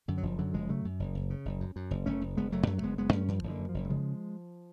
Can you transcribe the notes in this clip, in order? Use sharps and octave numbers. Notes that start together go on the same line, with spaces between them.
F#2 D3
F#3
F#1 F3
F#2 D3 F#3
F#1 F3 G#3
C#3 F#3 A3
F#2
F#1
F#1
C#3
F#1
F#2
F#2
F#1
F#1 A3 C#4
F#1
F#1 G#3 B3
F#1 F#3 A3
F#2 F#3 A3
A3
F#1 G#3 B3
F#1 G#3 B3
F#2 A3 C#4
F#2 F3
F#1
D3
F#2
F3
F#1
A3
C#3 F3 G#3